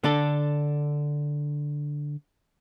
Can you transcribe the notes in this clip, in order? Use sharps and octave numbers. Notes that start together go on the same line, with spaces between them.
D3 D4 A4